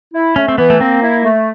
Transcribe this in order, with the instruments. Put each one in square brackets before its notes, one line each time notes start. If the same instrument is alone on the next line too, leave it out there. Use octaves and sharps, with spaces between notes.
[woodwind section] E4
[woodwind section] A3 [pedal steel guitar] C#4
[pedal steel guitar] C4
[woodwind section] E3 [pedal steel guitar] B3
[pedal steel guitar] A3
[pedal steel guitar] A#3 [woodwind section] C4
[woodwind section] E4
A3